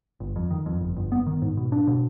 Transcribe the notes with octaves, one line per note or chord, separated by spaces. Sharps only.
G1
F2
D#3
F2
G1
G1
B3
D#3
G#2
B2
D4
B2